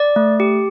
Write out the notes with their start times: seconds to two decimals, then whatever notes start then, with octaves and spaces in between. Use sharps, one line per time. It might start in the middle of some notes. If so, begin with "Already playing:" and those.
Already playing: D5
0.16 A3
0.40 G4